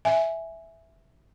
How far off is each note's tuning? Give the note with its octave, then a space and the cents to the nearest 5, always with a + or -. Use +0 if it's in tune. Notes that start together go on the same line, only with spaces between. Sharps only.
E5 +0 G#5 +0